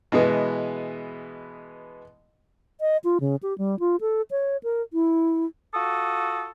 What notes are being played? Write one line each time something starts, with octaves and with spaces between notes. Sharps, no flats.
B2 E3 G#3 B3
D#5
F4
C#3
G4
G3
F4
A4
C#5
A#4
E4
F4 F#4 A4 D#6